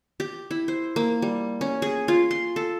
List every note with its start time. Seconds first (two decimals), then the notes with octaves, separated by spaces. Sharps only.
0.20 G4
0.51 E4
0.68 C5
0.96 A#3
1.22 G3
1.61 C#4
1.82 G#4
2.08 F4
2.31 C6
2.56 A4